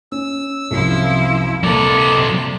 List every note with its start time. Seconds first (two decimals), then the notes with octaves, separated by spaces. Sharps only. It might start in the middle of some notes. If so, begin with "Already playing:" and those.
0.12 C#4 E6
0.71 C2 F#2 F3 E4
1.63 C3 F#3 A#3 A4 D5